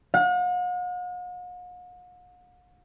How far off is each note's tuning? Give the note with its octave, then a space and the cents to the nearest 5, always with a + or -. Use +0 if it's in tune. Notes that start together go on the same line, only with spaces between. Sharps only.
F#5 -45